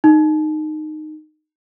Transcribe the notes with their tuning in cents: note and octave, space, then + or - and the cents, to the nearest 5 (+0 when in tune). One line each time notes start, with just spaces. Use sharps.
D#4 -15